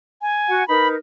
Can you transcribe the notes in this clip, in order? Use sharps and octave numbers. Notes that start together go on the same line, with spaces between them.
G#5
F#4 F#5
D#4 A#4 B4 B5